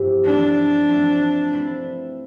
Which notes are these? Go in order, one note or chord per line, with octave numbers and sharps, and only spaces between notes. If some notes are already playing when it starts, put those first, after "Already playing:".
Already playing: G2 F3 B3 E4 G4
F3 A3 C4 D4
F3 A3 C4
F3 A3 C4 E4 B4